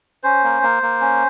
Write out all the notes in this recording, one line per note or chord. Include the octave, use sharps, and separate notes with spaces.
C#4 C5
A#3
A#3
A#3
C#4